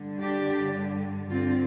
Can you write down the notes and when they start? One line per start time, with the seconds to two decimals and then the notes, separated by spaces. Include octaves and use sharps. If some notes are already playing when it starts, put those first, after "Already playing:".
Already playing: G2 D3
0.21 D4 G4
1.29 G2 D3 C4 F4